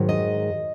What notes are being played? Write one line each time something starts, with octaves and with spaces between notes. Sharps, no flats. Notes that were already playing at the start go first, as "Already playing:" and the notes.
Already playing: G#2 D#3 F#3
D#5